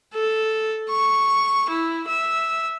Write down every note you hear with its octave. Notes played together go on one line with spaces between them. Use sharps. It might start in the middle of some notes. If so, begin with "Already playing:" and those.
A4
C#6
E4
E5